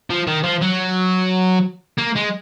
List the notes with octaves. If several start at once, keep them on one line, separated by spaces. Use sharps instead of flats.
F3
D#3
F3
F#3
A#3
G#3